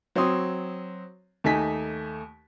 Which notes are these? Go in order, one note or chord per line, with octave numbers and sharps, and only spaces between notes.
F#3 C4 C#5 C6 D#6
D#2 A3 D#4 G#5 B6